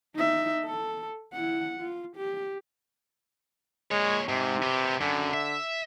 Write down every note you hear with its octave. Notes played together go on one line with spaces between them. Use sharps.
D#4 E5
A4
E4 F#5
F4
G4
A#2 G#3 C#5
G#2 C3
B3 G4
F#2 D3
E5